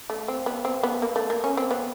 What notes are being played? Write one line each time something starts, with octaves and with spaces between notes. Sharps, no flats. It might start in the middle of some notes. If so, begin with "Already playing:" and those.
A3
C4
B3
C4
B3
A#3
A3
A#3
C#4
C4
B3